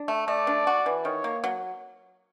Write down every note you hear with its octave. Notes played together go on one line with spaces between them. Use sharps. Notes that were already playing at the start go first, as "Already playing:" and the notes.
Already playing: D4
A3
A3 D5
D4
F#4
E3
D#3 C#5
A#3
F#3